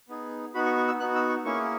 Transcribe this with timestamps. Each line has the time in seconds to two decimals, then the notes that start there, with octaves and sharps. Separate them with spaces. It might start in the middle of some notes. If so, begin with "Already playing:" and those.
0.09 B3 D#4 G#4
0.54 B3 D#4 F#4 B5
0.66 C#6
0.77 C#6
0.88 E6
0.99 B3 D#4 F#4 F#6
1.15 E6
1.29 C#6
1.44 A#3 C#4 E4 G#4 C#6